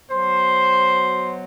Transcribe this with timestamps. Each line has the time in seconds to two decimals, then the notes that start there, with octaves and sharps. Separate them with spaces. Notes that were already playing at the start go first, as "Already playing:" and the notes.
0.11 B2 F#3 C5